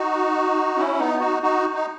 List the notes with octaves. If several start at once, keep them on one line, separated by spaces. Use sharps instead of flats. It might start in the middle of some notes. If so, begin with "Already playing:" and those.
Already playing: D#4 F#4
C#4 E4
B3 D#4
D#4 F#4
D#4 F#4
D#4